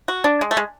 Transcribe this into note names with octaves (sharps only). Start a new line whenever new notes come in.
F#4
D4
G#3
A3
G#3